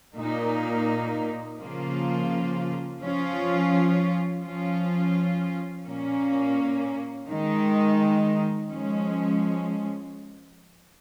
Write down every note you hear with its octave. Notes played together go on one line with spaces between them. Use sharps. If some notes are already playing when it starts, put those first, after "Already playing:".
A#2 A#3 D#4
C#3 F3 A#3 F4
F3 C#4 F4
F3 C#4 F4
A#2 A#3 C#4
D#3 G#3 D#4
F3 G#3 C#4